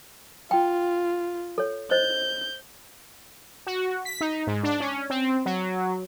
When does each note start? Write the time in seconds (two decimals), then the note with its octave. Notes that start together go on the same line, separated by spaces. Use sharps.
0.51 F4 G5
1.58 A4 C#5
1.91 C5 D#5 G6
3.67 F#4
4.05 B6
4.21 D#4
4.47 G#2
4.63 D4
4.80 C#4
5.10 C4
5.46 F#3